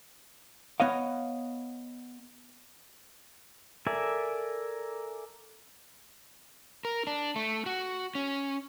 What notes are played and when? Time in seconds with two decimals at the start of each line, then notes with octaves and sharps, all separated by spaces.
0.80 B3 C#5 D#5 F5
3.87 A4 A#4 D5 E5 G#5
6.85 A#4
7.07 D4
7.36 A3
7.66 F#4
8.15 C#4